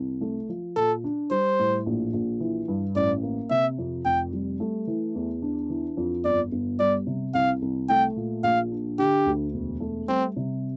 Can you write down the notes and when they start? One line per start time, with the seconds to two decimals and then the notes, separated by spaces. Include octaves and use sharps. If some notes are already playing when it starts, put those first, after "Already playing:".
Already playing: C2
0.21 A3
0.49 F3
0.76 A#2 A4
1.04 D4
1.31 G3 C5
1.59 A2
1.86 A#1
2.14 A#1
2.40 E3
2.68 G2
2.96 A1 D5
3.22 A#3
3.50 C3 E5
3.78 F2
4.05 F1 G5
4.32 G3
4.60 A3
4.87 E3
5.15 E2
5.42 D4
5.70 E3
5.97 F2
6.24 G1 D5
6.52 G1
6.79 G3 D5
7.07 C3
7.34 C2 F5
7.62 C2
7.89 A3 G5
8.16 A#2
8.43 A#1 F5
8.72 D4
8.99 D3 G4
9.26 D2
9.54 E1
9.80 A3
10.08 G3 C4
10.36 C3